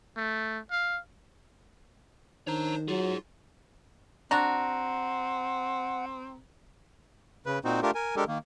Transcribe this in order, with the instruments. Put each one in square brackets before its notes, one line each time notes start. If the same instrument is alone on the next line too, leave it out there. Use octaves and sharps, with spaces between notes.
[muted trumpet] A3
F5
[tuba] D#3 [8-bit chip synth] D4 C5 [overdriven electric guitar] C#5 A#5
[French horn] F#3 [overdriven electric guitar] D#4 G#4 [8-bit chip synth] F4
[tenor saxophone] C4 [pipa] D4 F#4 [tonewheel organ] F#5 [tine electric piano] A#5
[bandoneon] C#3 B4
A#2 C4 D#4 F#4 C5
A3 D4 F4 G4 A#4
A#4 G#5
G#3 D4 G4 A4 A#4
D#3 A#3